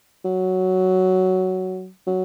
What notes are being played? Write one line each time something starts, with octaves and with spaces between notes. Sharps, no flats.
F#3
F#3